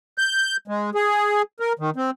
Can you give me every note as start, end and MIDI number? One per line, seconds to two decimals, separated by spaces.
0.18 0.57 91
0.68 0.90 56
0.95 1.42 68
1.60 1.73 70
1.79 1.90 51
1.96 2.10 60